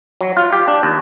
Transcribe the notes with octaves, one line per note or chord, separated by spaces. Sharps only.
F#3
F4
G4
D4
D#2